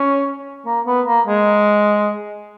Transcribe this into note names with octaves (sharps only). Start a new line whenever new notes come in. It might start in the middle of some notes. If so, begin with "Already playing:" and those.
Already playing: C#4
A#3
B3
A#3
G#3